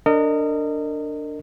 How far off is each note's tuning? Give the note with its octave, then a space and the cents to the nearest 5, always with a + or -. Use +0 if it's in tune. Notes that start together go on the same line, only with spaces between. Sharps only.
D4 +0 A#4 -35 D#5 -10